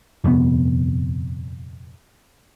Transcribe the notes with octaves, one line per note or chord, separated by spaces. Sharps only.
D#1 F2 C3 B3